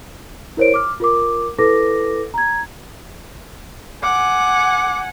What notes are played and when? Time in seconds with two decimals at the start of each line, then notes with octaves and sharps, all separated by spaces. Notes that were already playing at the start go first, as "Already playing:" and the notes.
0.57 E4 A#4 C5 C#5 D7
0.74 D6 F6
1.00 F4 A#4 D6
1.58 E4 A4 B4 D6 A#6
2.34 A#5 G#6
4.03 F#5 G#5 D6